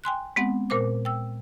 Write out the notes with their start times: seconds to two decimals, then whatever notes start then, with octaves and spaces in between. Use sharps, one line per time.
0.04 G5 G#5 C6 F#6
0.36 G#3 B3 C4 F#5
0.70 A#2 A#4 C5 D6
1.05 G5 E6